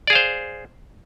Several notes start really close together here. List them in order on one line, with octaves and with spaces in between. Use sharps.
D5 G#4 F5 C5